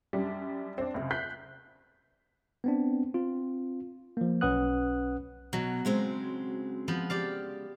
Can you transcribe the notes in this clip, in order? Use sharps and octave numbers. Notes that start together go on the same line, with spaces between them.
F#2 G3 D4
C4 D4
C#2 F#2 C3
F#6 G6 B6 C7
B3 C4 D4
C4 F4
F3 A#3
B1 C#4 B4 F#5 D#6 F#6
B2 F#3
C#3 G#3 C4
F3 B3
G4 D5 F5